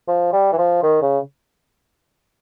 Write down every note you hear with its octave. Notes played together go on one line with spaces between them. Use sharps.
F3
G3
E3
F3
D#3
C#3